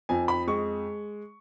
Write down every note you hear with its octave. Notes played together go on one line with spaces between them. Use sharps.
F2 G#5
B5
G#3 C#6